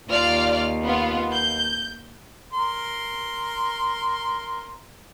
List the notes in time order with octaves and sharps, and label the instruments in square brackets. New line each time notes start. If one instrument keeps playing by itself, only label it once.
[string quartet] D#2 [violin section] F4 D5 F6
[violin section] B3 F4
G6
[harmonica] A#4 C6